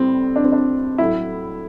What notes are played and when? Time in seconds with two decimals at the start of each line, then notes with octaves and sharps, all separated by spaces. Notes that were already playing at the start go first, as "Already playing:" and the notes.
Already playing: A2 G3 C4
0.36 D4
0.44 C4
0.52 D4
0.98 A2 F#3 A3 E4